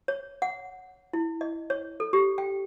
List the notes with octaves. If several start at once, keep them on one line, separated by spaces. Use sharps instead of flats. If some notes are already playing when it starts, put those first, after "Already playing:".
C#5
F#5
E4
D#5
C#5
A4
G4
G5